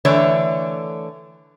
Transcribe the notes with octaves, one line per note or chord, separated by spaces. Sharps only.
D3 E3 A3 D4 C#5